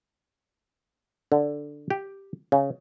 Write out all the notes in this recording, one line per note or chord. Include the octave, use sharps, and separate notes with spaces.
D3
G4
C#3